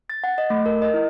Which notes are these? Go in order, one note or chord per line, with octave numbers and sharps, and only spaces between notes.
A6
F#5
D#5
A3
A#4
D#5
E4